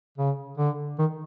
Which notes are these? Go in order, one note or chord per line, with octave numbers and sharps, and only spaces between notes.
C#3
D3
D#3